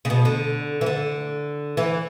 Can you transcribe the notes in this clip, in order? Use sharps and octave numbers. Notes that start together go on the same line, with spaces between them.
C#3
B2
D3
E3
D3
E3